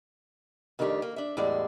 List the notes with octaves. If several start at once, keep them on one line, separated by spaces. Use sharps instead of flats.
F2 D#3 A3 D4 G4
A#3
D4 E5
E2 A2 G3 G#3 D5